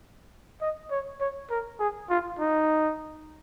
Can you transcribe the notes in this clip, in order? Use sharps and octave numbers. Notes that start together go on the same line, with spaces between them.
D#5
C#5
C#5
A#4
G#4
F4
D#4